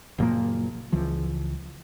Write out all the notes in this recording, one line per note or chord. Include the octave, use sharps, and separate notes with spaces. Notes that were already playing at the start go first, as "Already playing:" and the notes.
F#1 A#2 F3 A#3
C#2 E3 F3